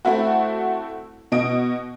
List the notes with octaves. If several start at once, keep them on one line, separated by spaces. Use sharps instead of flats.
A3 C4 E4 F#4
B2 D#5 D7